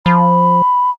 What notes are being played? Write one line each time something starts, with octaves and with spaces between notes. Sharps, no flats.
F3 B5